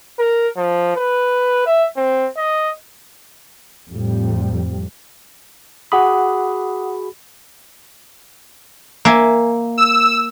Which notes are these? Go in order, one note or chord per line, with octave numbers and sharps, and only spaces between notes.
A#4
F3
B4
E5
C4
D#5
F2 A2 G3
F#4 G#4 F#5 B5 D6 D#6
A#3 E5 G#5
E6